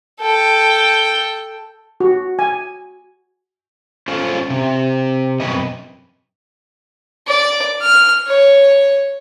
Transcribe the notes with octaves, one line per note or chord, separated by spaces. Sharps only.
A4 G5
F#4
G#5
C#4 F4 A4 C5
C3
F#2 B2 C4 C#4 B4 D#5
D5
F6
C#5